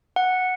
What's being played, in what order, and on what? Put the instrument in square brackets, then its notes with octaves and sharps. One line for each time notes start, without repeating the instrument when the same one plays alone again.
[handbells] F#5